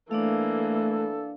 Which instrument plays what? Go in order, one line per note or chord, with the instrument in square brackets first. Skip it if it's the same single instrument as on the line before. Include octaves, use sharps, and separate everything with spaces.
[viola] E3 A#3 [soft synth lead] A3 [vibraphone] D4 D5 F5 [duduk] A4